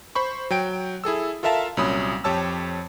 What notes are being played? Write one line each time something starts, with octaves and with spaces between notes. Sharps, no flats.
C5 B5 C#6
F#3 G5 D7
E4 G#4 A4 E6
F4 A4 A#4 E5 F5 A5
C2 A#2 F#3 C#4 B5 D#6
F2 G4 C#5 A5 E6